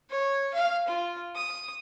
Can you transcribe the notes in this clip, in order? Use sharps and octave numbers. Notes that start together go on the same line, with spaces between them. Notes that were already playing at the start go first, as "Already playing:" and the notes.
C#5
F5
F4
D#6